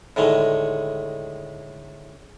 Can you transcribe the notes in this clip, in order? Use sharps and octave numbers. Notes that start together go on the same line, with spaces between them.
A2 D3 D#3 G#3